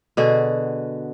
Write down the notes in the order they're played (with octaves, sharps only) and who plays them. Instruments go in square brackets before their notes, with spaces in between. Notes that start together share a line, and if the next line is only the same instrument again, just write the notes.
[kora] B2 D3 F#4 G#4